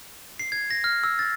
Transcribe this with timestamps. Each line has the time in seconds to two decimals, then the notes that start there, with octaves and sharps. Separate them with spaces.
0.39 C7
0.52 G#6
0.71 A#6
0.84 F6
1.04 E6
1.19 A6